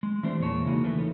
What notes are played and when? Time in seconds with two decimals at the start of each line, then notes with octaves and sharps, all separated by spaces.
0.03 G#3
0.23 E3 A3 C4 D4 G4 C5
0.39 E2 A#2 G#3 C#5 A5
0.65 C#3 E3 G#3 A#3 D#4 F#4
0.83 E3 F3 A3 B4
0.98 D#4 A4 C#5